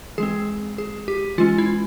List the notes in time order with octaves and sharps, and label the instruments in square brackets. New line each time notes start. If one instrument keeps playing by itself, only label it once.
[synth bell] E3 G#3 C4 G#4
G#4
G4
E3 G#3 C#4 F4
E4